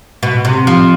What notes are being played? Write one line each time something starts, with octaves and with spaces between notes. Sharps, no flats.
B2
C3
F3